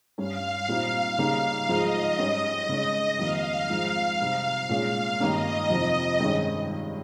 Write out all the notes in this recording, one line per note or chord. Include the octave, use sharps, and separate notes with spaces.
G2 G3 C#4 F5
A#2 G3 C4 D#4
C#3 G3 A#3 D#4
G#2 F3 G#3 D#4 D#5
G#2 G3 C#4
C#3 G#3 C#4
F2 D#3 G3 A#3 F5
G#2 F3 G#3 C4 D#4
C3 G3 C4 D#4
A#2 G#3 C#4 F5
G2 D#3 G3 A#3 C#4 D#5
F2 C3 F3
G2 D#3 G#3 C#4